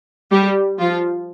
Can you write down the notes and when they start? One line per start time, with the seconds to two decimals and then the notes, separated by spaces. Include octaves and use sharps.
0.31 G3 G4
0.79 F3 F4